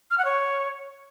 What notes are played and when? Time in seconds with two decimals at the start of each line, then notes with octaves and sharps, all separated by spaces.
0.11 F6
0.18 F#5
0.25 C#5